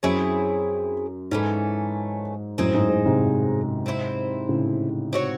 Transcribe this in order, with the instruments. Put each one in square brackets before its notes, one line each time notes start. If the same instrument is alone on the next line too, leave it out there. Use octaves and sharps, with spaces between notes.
[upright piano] F#2 [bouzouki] C4 E4 G#4 C#5
[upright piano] G#2 [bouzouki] E3 A3 C#4
[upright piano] F#2 A2 [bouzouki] C4 D#4 G#4 C5
[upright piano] G#2
G#2
G#2 C3
[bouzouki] C4 E4 C5
[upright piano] A2 C#3
[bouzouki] C4 F#4 C#5